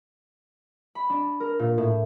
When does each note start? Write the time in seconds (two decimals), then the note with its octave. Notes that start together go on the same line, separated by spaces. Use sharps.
0.95 B5
1.10 D4
1.40 A#4
1.59 A#2
1.78 A2